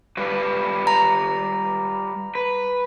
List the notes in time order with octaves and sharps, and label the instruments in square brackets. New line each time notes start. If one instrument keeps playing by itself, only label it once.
[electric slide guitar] G3 F4 B4
[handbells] A#5
[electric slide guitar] B4